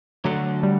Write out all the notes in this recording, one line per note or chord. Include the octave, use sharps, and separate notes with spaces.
D3 F#3 A3 D4 F#4 A4
G3